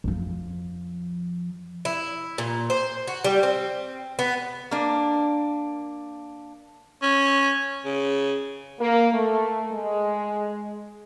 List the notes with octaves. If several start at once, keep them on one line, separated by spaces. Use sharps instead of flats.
F2 F3
E4
A#2
C5
F#4
G3
C4
B3
A#3 D4
C#4
C#3
A#3
A3
G#3